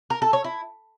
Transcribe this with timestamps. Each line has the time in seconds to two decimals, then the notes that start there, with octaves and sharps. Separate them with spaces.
0.10 A#4
0.22 A4
0.33 C#5
0.44 E4